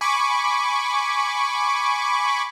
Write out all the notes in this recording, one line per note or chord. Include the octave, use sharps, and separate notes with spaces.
G#5 B5 C#6 D6